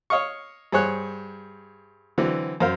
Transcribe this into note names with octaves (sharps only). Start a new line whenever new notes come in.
C#5 D#5 F5 C#6
G2 G#4 C5 C#5 F#6
D3 E3 F#3 C4
F#2 A#4 C5 F5